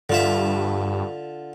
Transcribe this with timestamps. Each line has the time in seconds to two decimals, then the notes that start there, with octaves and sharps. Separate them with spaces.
0.10 G2 D3 F4 E5